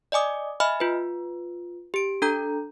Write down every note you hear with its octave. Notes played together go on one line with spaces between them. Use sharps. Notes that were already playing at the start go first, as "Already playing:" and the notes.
D5 D#5 G#5 D6 D#6
D#5 E5 G#5 B5 F6
F4 B4
G4 D7
D4 A4 A#5 G6